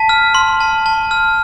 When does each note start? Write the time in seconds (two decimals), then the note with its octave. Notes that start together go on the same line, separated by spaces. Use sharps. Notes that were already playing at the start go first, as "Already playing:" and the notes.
Already playing: A5 B6
0.09 F6
0.35 C6
0.60 A5
0.86 A5
1.11 F6